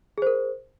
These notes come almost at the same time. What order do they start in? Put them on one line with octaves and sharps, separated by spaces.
G#4 C5 A#4